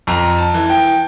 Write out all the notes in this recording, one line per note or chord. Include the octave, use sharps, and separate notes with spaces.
F2 A#5
A5
E3
G5